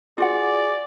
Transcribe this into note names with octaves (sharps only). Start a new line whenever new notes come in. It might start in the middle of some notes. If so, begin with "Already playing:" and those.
F4 F#4 G#4 D5 F#5